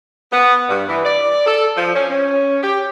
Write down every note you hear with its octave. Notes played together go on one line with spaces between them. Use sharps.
B3
G2
E3
D5
A4
F3
C#4
C#4
G4